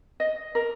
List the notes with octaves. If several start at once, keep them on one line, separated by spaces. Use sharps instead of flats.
D#5
A#4